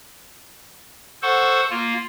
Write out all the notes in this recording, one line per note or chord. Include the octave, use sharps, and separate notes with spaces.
A4 C5 F#5 C#6
A#3 F4